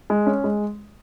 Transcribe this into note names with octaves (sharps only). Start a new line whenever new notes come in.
G#3
C#4
G#3